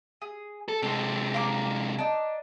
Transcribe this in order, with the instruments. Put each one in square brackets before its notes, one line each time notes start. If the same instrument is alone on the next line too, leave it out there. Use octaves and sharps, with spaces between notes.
[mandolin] G#4
[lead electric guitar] A4
[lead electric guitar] C3 G#3 [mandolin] A4
[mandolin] A#3 A#5 D6
D4 D#4